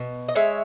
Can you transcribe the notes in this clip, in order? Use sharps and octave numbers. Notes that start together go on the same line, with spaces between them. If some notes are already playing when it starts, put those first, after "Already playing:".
Already playing: B2
D#5
G#3 C#5 E5